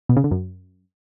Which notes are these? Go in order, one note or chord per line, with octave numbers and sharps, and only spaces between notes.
B2
C#3
D3
F#2